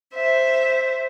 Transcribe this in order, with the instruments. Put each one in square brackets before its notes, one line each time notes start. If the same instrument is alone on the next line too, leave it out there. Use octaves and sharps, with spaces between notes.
[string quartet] C5 E5